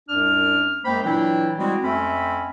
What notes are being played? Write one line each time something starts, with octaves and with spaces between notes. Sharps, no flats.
C2 F#2 D4 F6
F#2 G#3 A#3 C5 G5 B5
A#2 E3 F#3 D4 E4 G5
G3 G#3 C4 E4 F#4
F2 A3 C4 C#4 E5 B5